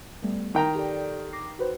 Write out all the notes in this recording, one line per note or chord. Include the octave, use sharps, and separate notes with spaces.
G3 A3 B3
D#3 G5 A#5
G4 A4 D5
D6 A#6 C7
F#4 B4 C5